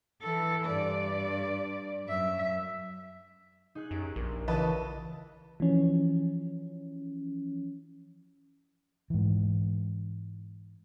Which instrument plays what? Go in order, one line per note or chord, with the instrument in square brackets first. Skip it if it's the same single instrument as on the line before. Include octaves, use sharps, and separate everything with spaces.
[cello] E3 A4
G2 D5
F#2 E5
[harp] D#4 G#4 F#6
[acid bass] F#2 [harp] G4 D7
[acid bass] A#1 [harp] A#3
[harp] C#2 E3 A6 [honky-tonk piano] B4 D#5 A5
[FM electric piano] E3 F3 C#4
[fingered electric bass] G#2 E3